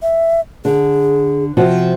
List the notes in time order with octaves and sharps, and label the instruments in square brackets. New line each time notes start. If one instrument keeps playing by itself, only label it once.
[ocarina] E5
[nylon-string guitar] D3 [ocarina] G#4
[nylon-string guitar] C3 F3 F#4